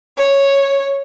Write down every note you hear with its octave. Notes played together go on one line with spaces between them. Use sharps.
C#5